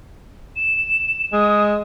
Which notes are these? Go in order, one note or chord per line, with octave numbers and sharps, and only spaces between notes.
E7
G#3 D#6